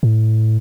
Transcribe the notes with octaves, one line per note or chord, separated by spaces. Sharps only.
A2